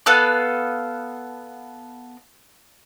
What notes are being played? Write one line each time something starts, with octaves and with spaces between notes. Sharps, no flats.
B3 A4 F5 F#6